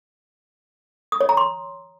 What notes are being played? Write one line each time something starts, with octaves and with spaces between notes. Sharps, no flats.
D#6
C#5
A#5
C6